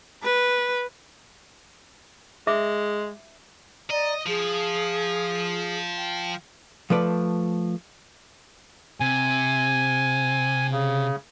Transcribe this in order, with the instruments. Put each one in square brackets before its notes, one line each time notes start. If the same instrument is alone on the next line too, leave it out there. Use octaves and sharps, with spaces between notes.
[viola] B4
[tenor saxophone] G#3 [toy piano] E5 D6
[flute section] D5 A#5 [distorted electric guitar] D#5
[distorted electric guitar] F3 [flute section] G#4
[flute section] G5
[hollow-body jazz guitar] F3 A3 B4 D5
[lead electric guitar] C3 [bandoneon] G#5
[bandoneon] C#3